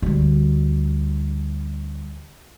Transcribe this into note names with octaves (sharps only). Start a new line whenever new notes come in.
D2 G3